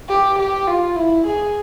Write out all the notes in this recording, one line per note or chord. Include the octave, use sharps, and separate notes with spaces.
G4
G4
F4
E4
G#4